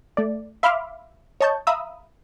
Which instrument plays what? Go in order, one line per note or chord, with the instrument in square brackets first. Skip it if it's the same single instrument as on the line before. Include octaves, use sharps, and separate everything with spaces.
[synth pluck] A3 D5
E5 F5 B5 C6 D6 F6
C#5 D#5 A5 C#6 G6
E5 F5 A#5 B5 D#6 E6